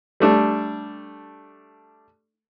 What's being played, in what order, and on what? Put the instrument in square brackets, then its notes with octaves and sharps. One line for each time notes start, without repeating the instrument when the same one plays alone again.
[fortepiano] G3 A3 D4